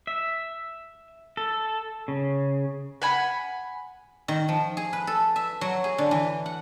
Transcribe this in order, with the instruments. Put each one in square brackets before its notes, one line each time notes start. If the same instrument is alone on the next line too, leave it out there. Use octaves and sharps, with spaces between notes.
[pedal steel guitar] E5
A4
C#3
[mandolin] F#5 G#5 B5
[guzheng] D#3
F3
G#4
B4
A4
E5
F#3
G#4
D3
E3
F#5